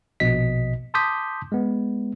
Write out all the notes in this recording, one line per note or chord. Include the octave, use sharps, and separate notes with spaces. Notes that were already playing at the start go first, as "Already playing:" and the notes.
A#1 B2 D#5 B6
A5 C6 D6 D#6 G6 B6
G#3 B3